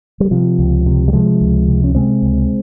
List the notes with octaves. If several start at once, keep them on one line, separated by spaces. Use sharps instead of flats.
G3
C3 F3
C#2
C3
G3
C3 F3 G#3
C#2
C3
C#4
C3 G#3 C4
C#2